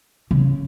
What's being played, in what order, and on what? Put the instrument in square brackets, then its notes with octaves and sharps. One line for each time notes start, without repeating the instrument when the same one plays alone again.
[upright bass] C#3